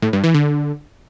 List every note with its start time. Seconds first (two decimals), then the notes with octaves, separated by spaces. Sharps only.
0.02 A2
0.13 G2
0.24 E3
0.34 D3